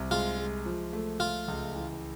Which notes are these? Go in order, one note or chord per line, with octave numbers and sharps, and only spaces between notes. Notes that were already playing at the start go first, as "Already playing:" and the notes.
Already playing: C2 C3
G#3 F4
G#3
F3
A3
A3 F4
C#2
E3